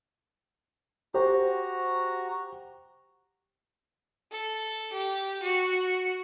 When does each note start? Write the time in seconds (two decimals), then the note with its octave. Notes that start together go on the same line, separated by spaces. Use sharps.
1.14 F#4 G4 C5 A#5
4.31 A4
4.92 G4
5.42 F#4